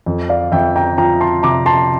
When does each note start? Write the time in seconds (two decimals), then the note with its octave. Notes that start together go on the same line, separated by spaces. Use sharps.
0.06 F2
0.29 D5 F5
0.52 F2 E5 G5
0.76 G5 A#5
0.97 F3 G5 A#5
1.20 A5 C6
1.43 C3 A#5 D6
1.66 A5 C6